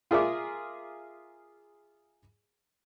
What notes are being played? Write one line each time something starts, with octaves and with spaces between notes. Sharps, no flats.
F4 G#4 A#4 E5 D6